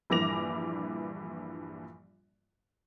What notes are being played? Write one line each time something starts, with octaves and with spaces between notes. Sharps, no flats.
A#1 G2 E3 D6 A#6 F7